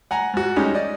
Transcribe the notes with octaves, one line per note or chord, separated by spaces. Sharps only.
F#5 G#5 A#5
G#2 F#4
G3 G#3 C#4 D#4
D5 D#5